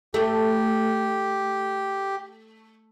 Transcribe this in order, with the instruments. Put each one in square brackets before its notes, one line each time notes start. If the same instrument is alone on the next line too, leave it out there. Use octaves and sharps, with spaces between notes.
[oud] A3 [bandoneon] G4